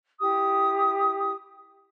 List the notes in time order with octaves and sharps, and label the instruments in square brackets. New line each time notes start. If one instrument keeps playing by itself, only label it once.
[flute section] E4 G4 D#6